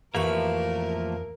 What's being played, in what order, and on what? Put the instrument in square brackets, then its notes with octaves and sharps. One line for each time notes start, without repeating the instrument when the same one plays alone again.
[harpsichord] A1 B5 C#6 [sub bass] F2 [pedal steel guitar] F3 A3 A#3 [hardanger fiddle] A#4